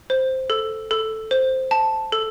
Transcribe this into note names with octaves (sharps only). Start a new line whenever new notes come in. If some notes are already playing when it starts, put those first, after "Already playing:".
C5
A4
A4
C5
A5
A4